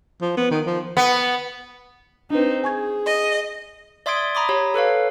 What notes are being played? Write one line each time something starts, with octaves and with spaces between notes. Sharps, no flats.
F3
B3
D#3
F3
B3
C4 D4 D#4 B4
G#4 G#5 C#6 G#6
D#5
D5 E5 C6 D#6 G#6 D7
A#5 B5 D6 D#6
G4 C#5
A4 B4 C#5 F5